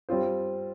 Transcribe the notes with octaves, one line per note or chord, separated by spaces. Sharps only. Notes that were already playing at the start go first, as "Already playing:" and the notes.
G3 C4 F4 C5